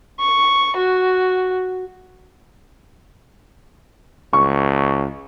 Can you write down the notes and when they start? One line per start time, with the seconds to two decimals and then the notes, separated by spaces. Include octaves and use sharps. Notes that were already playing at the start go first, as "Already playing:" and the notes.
0.20 C#6
0.77 F#4
4.33 C#2 C#6